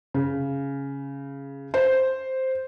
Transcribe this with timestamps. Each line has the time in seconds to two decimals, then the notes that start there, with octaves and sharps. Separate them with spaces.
0.14 C#3
1.74 C5